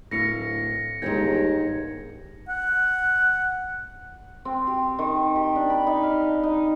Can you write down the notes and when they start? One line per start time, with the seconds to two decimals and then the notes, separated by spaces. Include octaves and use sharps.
0.11 D1 A2 F5 A#6 C#7
1.02 G1 D#2 G#2 D#3 G5 G#6
2.49 F#5
4.45 C4
4.67 G4
4.99 D#3
5.36 G4
5.56 D4
5.70 B5
5.87 D#4
6.03 F5
6.43 D#4